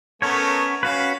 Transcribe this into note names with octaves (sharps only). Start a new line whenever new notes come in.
A3 B3 C#4 A#4 C#5
C#4 F#4 B4 F5